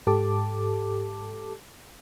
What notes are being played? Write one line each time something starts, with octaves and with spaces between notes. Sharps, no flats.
G#2 G4 A4 A5 D6